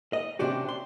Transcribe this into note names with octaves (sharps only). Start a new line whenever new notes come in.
D#5
C3 C#4 D4 F#4 G4
C6